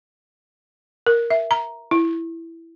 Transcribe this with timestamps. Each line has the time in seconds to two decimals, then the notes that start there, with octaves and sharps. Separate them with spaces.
1.06 A#4
1.30 E5
1.51 A#5
1.91 E4